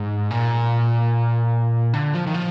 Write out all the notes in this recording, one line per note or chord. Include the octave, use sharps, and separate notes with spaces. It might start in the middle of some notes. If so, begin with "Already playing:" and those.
Already playing: G#2
A#2
D3
F3
D#3
F3